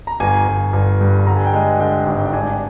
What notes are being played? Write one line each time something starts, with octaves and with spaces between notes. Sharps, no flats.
A#5
G1 G#5
G1
G1
G2
D3 A#5
G#5
G5
G#3 G#5
D3 G5
G#1
G5
D4 G#5